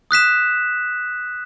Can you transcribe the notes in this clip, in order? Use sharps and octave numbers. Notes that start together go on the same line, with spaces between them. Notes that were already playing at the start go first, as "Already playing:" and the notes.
D#6 F#6 B6 E7